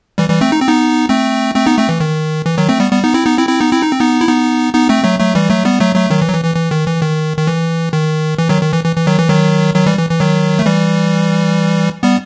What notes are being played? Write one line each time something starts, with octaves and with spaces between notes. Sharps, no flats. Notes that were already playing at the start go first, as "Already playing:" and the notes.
E3 G3
E3 G3
A3 C4
D#4
C4
B3 D#4
A3 C4
A3 C4
B3 D#4
A3 C4
E3
D#3
E3
D#3 F#3
A3 C4
G3 B3
G3 B3
B3 D#4
C4 E4
B3 D#4
C4 E4
C4 E4
B3 D#4
C4 E4
D#4
C4
B3 D#4
E4
B3 D#4
B3 D#4
A3 C4
F#3 A3
F#3 A3
E3 G3
F#3 A3
G3 B3
F#3 A3
F#3 A3
D#3 F#3
E3
F#3
E3
E3
E3
D#3
E3
D#3
D#3
E3
D#3
E3
D#3 F#3
D#3
E3
E3
E3
D#3 F#3
E3
D#3 F#3
D#3 F#3
E3 G3
E3
E3
D#3 F#3
A3
E3 G3
G3 B3